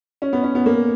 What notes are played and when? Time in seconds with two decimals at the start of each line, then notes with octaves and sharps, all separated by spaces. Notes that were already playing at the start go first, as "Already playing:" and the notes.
0.22 C#4
0.33 B3
0.43 C#4
0.55 B3
0.66 A#3